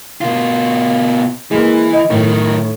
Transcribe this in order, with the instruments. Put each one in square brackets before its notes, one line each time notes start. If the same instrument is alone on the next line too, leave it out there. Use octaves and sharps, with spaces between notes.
[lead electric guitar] B2 F4
[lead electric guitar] E3 [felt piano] G#3 A#3
[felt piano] D#5
[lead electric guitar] F#2 D#3 [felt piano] A2